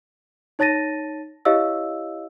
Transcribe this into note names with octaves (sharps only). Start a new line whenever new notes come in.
D#4 C#5 A5 A6 A#6 D#7
E4 G4 C#5 D#5 F5 E6